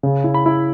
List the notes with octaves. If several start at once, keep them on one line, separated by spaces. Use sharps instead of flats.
C#3
E4
B5
E4